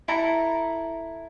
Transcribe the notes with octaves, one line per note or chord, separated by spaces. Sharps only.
E4 A4 A#5